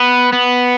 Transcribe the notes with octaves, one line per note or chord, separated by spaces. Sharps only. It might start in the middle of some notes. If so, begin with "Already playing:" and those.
Already playing: B3
B3